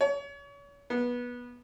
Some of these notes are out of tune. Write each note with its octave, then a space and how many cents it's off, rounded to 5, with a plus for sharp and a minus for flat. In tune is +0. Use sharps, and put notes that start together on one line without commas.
C#5 +35
B3 -20